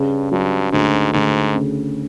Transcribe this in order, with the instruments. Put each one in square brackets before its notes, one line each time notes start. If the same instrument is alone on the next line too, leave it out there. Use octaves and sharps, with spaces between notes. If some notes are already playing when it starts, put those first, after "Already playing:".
Already playing: [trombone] G2 [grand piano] C#3
[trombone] G2 [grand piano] F#3
[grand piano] D2 [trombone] G#2
[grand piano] D2 [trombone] G#2
[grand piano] C#3